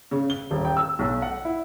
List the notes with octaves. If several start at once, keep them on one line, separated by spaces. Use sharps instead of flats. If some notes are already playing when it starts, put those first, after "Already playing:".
C#3
G7
D#1
G5
E6
B1
F#5
E4